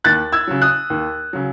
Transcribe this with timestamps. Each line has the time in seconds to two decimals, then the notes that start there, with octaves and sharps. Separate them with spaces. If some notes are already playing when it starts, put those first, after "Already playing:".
0.04 D#2 F#6 A6
0.32 E6 G#6
0.48 C#3 F#3
0.62 D#6 F#6
0.90 D#2
1.33 C#3 F#3